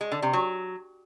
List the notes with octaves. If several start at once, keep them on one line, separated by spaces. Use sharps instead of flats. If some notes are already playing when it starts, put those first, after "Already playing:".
G#3
D3
C3
F#3